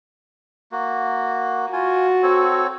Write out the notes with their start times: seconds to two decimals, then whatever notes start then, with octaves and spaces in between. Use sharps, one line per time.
0.72 A#3 F#4
1.73 F4 F#4 G#5
2.23 C4 A4 C#5